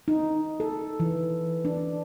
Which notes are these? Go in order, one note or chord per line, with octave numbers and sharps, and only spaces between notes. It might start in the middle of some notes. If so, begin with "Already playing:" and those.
D#4
A4
E3
D4